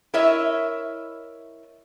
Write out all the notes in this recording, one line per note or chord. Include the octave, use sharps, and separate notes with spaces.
E4 A#4 C#5 D#5 E5